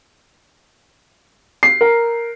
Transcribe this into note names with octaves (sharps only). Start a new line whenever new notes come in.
C7
A#4